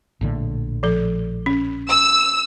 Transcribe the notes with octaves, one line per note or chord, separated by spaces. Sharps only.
A#1 A2 D3
F3 A4
C#4
E6